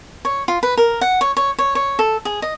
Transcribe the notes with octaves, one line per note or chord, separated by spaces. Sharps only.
C#5
F4
B4
A#4
F#5
C#5
C#5
C#5
C#5
A4
G#4
D#5